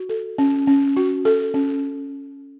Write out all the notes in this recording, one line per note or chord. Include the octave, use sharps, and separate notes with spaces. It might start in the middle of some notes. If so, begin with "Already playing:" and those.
Already playing: F#4
A4
C#4
C#4
F#4
A4
C#4